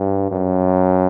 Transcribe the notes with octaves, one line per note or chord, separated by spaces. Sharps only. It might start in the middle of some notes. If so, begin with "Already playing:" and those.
Already playing: G2
F#2